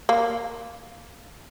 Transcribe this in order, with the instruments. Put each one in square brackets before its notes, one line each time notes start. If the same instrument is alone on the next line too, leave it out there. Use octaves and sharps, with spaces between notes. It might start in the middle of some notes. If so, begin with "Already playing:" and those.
[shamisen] A#3